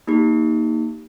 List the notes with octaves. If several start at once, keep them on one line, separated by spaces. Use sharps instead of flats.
A#3 D#4 G4